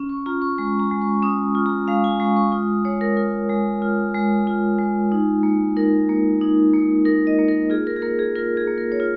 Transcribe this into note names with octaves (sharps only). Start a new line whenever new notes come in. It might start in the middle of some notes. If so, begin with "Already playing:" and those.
Already playing: C#4
C#6
F4 A#5
C#6
G#3 C#6
A#5
G#3
C#6
C#4 D#6
F4
A#5
G#3 F5
G#5
G#3 C#6
C#6
F4 D#6
G#3 C#5
A#4
F4 A#4
G#3
F4
G#3
F4
G#3
D#4
A#3
D#4 A#4
A#3
D#4
A#3
D#4 A#4
D#5
A#3
A#4
F4 G#4
A#4
G#4
A#3 A#4
G#4
F4 A#4
G#4
A#3
A#4
C#5
F4